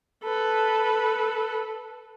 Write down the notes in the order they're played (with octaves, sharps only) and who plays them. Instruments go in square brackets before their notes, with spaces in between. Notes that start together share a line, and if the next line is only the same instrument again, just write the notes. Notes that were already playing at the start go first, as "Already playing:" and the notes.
[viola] A4 B4